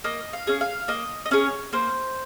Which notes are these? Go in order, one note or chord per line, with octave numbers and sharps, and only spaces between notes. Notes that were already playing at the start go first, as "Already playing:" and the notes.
A#3 D#5
F5
C#4 G#4
F5
A#3 D#5
D#5
C#4 G#4 C#5
A#3 C5